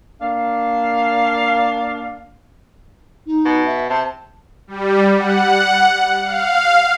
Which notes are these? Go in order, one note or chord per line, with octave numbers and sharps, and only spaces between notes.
A#3 D4 F5
D#4
B2
E5
C3 A5
G3
F#5
F5